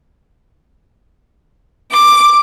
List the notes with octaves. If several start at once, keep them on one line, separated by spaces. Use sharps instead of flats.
D6